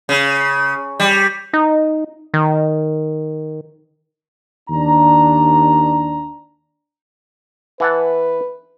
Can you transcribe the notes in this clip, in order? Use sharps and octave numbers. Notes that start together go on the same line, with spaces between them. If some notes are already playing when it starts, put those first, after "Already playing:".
C#3
G3
D#4
D#3
D#2 D4 A#5
E3 B4 F#5 A5